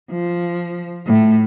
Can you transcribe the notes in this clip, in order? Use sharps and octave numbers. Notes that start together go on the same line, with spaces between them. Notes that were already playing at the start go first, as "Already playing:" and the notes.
F3
A2 A3